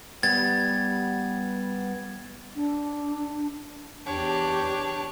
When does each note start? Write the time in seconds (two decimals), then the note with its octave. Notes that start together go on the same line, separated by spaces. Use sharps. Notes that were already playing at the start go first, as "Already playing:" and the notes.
0.23 G3 B3 G#6 A6
2.54 D4
4.06 E2 D4 G4 C#5